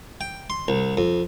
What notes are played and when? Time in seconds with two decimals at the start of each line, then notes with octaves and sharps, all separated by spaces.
0.21 G5
0.50 C6
0.68 C2
0.97 F2